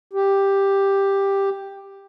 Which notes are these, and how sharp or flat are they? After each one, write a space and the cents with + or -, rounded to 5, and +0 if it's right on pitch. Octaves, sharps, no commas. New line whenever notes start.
G4 +5